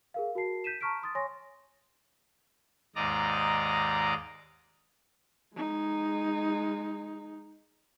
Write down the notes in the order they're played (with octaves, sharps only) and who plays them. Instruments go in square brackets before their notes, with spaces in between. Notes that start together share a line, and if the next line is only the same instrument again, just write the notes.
[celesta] G#4 A#4 F5
F#4 A#4 A5 C7
G6 B6 D#7 E7
A5 A#5 C#6 F6 B6 D7
C6 D#6 A6
C#5 G#5 C6 C#6 A#6
[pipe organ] D#2 G#2 D5 D#5 A#5
[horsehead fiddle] G#3 D#4